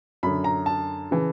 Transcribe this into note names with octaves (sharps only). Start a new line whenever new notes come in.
F#2 D3 B5
A#5
A5
C#3 E3